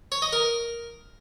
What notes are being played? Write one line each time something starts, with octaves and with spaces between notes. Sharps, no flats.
C#5
D#5
A#4